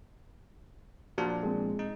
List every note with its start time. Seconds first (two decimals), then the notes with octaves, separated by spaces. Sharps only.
1.18 A#2 F3 D4 F#4 A5
1.43 G#3 C4
1.79 D#4